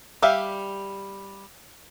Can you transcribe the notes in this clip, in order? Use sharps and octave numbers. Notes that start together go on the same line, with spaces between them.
G3 G4 E5 F5